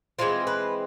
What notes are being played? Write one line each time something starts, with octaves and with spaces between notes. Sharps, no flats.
E3 G#3 C4 F4
B4